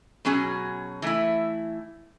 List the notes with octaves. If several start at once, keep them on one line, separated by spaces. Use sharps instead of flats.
B2 F#3 C#4 G#4
E3 A3 E4